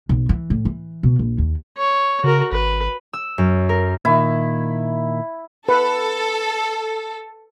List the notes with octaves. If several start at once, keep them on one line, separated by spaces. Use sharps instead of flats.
B1
E3
A2
E3
B2
A#1
D#2
C#5
C#3 F#4 A#4
G#1 B4
E6
F#2
A#4
A#2 D#3 E4
A4 B4